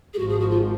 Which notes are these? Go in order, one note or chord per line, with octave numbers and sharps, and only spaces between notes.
G#4
G#1 G#2 F3 F#4
G#4
F#4
F4